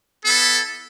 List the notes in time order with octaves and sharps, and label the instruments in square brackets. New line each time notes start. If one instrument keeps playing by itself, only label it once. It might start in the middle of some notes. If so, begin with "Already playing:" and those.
[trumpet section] B3 E4 A4